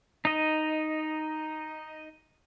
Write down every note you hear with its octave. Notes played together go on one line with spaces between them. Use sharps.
D#4 D#5